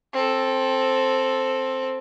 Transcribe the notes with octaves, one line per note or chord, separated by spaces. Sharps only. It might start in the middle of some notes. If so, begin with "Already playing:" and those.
C4 A4